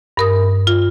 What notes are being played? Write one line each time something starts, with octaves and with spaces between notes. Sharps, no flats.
G2 A#4 D#6
F4